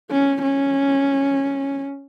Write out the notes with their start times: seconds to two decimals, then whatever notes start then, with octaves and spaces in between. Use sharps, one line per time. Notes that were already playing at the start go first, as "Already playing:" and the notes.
0.11 C#4
0.42 C#4